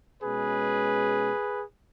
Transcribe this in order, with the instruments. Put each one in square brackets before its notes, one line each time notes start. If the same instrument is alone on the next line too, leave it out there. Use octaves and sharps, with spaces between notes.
[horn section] B2 G#3 C#4 G#4 B4